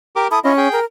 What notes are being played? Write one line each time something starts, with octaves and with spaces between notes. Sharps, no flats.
G4 A#4 D6
E4 A4 D#6
C#4 E4 F4 D#5
G#4 G5
A#4